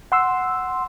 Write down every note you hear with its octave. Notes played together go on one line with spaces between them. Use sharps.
F#5 C6 E6